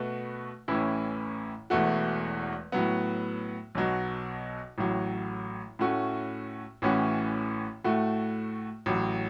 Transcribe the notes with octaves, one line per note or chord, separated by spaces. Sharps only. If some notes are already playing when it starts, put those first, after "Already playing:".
Already playing: B2 A3 F#4 B4
A1 A2 E3 C#4 E4
E1 E2 E3 A3 F#4
A2 F#3 B3
B1 B2 F#3
A1 A2 F#3
A2 A3 C#4 F#4
A1 A2 E3 C#4 F#4
A2 A3 F#4
A1 A2 F#3